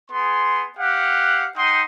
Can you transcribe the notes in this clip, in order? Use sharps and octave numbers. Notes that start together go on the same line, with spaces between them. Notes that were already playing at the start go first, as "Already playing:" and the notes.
B3 G#4 C6
G4 F5 F#5
D#4 F#5 G5 C6 D#6